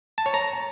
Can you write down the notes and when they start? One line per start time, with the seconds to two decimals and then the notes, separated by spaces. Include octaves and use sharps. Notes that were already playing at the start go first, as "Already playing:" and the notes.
0.18 A5
0.26 C#5
0.34 A#5